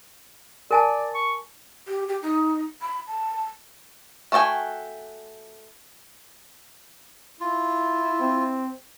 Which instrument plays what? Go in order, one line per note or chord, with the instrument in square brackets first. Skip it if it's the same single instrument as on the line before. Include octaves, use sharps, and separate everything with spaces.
[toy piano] A#4 G#5 A5 [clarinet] D5
[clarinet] C#6
[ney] G4
G4
D#4
B5
A5
[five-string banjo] A3 F#4 D5 G5 G#5
[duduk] E4 [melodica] F4
[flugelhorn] C4